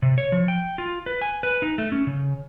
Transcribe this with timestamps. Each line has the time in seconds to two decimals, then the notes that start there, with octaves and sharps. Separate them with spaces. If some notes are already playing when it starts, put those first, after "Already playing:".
0.02 C3
0.18 C#5
0.32 F3
0.48 G5
0.78 F4
1.06 B4
1.22 G#5
1.43 B4
1.62 D#4
1.78 A3
1.92 C#4
2.07 C#3